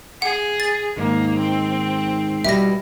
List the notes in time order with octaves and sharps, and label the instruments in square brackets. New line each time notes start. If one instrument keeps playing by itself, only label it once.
[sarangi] G#4 [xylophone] F#5
[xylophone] A6
[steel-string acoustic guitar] G#2 D#3 [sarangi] A#3
[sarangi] C4
[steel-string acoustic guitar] B2 G3 E4 [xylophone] E5 A#6